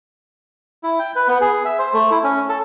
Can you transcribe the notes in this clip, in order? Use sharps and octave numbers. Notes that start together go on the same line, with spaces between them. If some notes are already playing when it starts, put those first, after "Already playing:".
E4
G5
B4
B3
G#4
E5
C5
A3
E4
C#4
A4